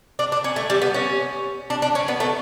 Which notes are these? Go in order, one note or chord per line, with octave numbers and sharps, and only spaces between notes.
D4
D4
C#4
A3
G3
B3
C#4
D4
D4
C#4
B3
A3